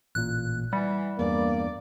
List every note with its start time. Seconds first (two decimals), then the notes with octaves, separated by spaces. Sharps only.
0.15 A1 A#2 F#6
0.73 E3 G3 F#5
1.19 E2 G2 A#3 D5